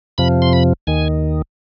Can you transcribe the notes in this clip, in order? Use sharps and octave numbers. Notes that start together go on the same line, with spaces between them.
F2 C3 F3 B5
C6
B5
D#2 D#3 G#5